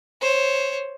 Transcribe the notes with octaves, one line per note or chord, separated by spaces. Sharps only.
C5 C#5